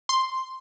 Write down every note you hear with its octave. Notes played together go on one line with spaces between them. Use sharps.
C6